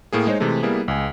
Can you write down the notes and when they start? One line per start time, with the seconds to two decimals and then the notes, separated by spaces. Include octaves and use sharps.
0.13 A2 A#3 G#4
0.27 G#3 D#4 C5 C#5
0.40 C3 E3 G#3 A3
0.63 G3 A#3 B3 E4 G#4
0.88 C#2 G#5